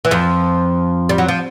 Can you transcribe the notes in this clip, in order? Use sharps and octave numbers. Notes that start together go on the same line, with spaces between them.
E3
F2 F3
G3
F#3
F3